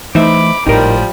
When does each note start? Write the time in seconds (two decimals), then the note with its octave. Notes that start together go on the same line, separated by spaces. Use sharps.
0.15 E3 A3 D#4 C5 E5 B5 D6
0.67 G#1 A2 F3 G3 D#4 A#4